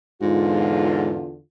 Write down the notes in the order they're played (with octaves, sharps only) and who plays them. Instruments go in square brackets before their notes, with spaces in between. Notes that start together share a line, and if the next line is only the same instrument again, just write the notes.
[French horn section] E2 D3 F4 [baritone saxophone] G#2